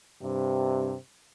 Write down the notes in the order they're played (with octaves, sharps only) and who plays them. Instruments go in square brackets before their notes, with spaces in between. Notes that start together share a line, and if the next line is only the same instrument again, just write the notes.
[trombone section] G2 C3